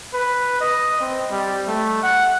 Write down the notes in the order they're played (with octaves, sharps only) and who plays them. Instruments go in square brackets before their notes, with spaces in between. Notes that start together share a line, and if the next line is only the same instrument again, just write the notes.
[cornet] B4
D#5
C4
G3
A3
F#5